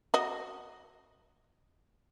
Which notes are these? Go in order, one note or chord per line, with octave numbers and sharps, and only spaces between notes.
F#4 D#5